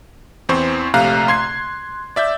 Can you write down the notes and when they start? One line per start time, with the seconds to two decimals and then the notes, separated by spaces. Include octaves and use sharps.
0.49 E2 E3 C4 C5 C#6
0.94 A#1 C3 A3 F5 A#5 F#6
1.28 C6 G#6 C7
2.16 D5 E5 E6 G6